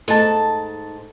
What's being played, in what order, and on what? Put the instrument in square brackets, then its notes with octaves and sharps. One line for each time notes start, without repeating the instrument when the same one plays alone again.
[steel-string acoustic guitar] G#2 A5 [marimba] A3 A4 D#5